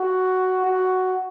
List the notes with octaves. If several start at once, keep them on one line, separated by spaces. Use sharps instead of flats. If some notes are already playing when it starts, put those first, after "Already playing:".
Already playing: F#4
F#4